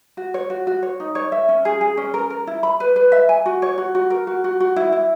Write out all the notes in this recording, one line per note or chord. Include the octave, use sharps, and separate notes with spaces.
F#4
C#5
F#4
F#4
C#5
D#4
C#5
E5
C#4
G#4
G#4
C#4
A#4
A#4
E4
B5
B4
B4
E5
G#5
F#4
C#5
F#4
F#4
A#4
F#4
F#4
F#4
E4
E4